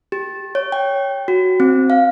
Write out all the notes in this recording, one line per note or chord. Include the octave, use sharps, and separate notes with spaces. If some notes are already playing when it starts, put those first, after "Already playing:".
G4
C#5
G5
F#4
C4
F5